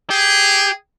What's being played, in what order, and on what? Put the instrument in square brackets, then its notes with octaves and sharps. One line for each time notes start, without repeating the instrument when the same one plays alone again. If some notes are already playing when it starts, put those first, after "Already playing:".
[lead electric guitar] G4 [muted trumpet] G#4